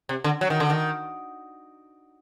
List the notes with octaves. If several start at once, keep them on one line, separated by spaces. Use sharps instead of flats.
C3
D3
F#3
D#3
D3
D#3